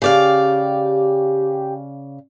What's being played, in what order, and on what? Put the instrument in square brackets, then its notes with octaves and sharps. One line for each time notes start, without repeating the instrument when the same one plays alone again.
[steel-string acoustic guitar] C#3 D5 F5 [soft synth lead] G4